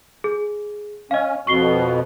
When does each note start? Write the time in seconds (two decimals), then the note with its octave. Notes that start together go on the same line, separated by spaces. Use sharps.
0.24 G#4
1.11 C#4 D#5 F5
1.47 F2 B2 C#6 C7 G7